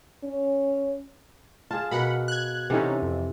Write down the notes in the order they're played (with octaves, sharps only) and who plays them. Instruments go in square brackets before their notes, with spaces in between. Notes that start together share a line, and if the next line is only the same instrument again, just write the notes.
[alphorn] C#4
[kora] F4 G#4 [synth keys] A5
[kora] B2 A#4 B4 [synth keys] F#5 B5
[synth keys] F#6 G#6
[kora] C3 E3 A4 [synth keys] C#4 D#4 F#5
[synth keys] F2